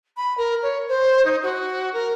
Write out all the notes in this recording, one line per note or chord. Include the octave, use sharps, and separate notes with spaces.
B5
A#4
C#5
C5
D#4
F#4
A#4